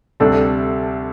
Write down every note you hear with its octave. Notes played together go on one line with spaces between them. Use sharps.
D2 C3 G3 D4 A4